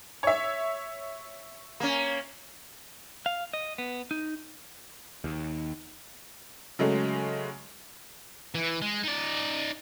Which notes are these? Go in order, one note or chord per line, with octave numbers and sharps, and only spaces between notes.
C#5 E5
A#3 C#4
F5
D#5
B3
D#4
D#2
C#3 F#3 G#3 A3
E3
G#3
D#4 D5